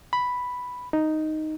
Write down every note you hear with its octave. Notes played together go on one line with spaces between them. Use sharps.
B5
D#4